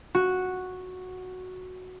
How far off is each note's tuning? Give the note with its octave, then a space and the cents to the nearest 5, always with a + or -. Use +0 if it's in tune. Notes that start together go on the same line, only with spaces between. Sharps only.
F#4 -5